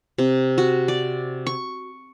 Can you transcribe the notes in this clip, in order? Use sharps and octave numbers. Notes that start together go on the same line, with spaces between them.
C3
F#4
D5
C#6